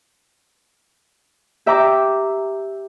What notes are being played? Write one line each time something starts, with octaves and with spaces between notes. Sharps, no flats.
G4 E5 G5 A#5 D6